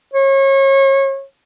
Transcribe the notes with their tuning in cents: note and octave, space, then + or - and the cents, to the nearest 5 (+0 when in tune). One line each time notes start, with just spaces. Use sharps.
C#5 -30